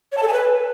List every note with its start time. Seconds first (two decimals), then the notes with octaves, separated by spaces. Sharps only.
0.12 C#5
0.17 A5
0.22 A4
0.28 G#5
0.33 B4